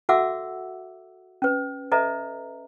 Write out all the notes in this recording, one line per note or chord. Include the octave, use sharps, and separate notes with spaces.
F#4 A4 E5 F#5 D6 E6
C#4 B4
A4 B4 D#5 E5 A#5